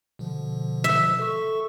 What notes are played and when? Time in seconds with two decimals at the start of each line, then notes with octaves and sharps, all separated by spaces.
0.19 B2 D3 F3
0.84 E5
1.19 A4 C#6